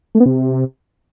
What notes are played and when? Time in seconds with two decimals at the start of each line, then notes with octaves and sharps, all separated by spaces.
0.15 A3
0.20 B3
0.26 C3